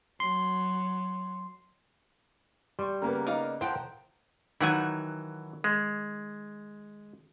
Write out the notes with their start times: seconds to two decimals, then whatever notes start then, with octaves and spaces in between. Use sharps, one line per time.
0.20 F#3 C6
2.79 G3 C6 C#6
3.02 C#3 A#3 B3 A#4 G#5 A#5
3.27 D#4 D5 F5
3.61 F3 C5 F#5 G5 A5
4.61 D#3 E3 F#3 F#5 G#5
5.64 G#3